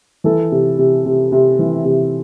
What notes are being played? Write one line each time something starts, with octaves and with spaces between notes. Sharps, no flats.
E3 A4
C3
C3
C3
C3
E3
C3